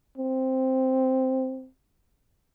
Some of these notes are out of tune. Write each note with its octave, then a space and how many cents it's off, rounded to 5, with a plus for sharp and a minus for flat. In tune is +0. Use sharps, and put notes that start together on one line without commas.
C4 +0